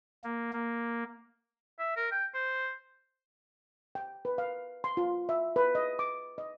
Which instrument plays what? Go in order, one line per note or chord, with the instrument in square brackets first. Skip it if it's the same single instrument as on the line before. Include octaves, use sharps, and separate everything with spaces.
[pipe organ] A#3
A#3
[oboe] E5
A#4
G5
C5
[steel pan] G5
B4
F5
C6
F4
E5
B4
D#5
D6
D#5